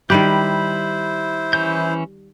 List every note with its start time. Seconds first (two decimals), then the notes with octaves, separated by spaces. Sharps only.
0.10 D#3 G3 E4 G4 C5 B5 F#6
1.53 E3 C#4 G6